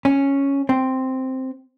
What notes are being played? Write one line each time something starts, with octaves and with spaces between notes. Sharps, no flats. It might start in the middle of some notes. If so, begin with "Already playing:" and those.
C#4
C4